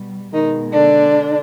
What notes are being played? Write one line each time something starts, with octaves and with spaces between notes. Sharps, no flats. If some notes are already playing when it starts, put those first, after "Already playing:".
Already playing: B2 G3
B2 D#3 G#3 D#4
D3 D4